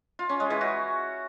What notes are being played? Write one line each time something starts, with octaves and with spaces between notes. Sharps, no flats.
F4
C#4
G#3
E3
F#4